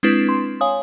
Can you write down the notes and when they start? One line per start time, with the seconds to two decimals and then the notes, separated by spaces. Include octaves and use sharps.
0.03 G#3 C4 D4 E4 B4
0.29 C6
0.61 C#5 F5 G#5 D#6